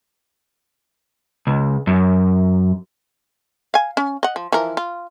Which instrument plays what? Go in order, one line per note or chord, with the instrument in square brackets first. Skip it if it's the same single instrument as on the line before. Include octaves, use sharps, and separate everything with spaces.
[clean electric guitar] C#2
F#2
[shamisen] F5 G#5
C#4
D#5 F#5
F3
E3 F3 A#4
F4